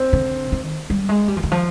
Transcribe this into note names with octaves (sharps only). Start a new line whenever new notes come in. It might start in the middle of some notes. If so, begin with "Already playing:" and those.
Already playing: C4
D3
D#3
G3
G#3
G3
F3
D#3
F3